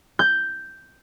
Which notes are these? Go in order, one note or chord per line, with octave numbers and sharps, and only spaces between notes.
G6